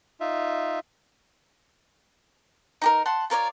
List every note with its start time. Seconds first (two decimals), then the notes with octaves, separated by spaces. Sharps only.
0.20 D#4 F4 E5
2.82 D#4 G4 A#4
3.05 F#5 A5 C6
3.30 F4 A#4 C#5 D5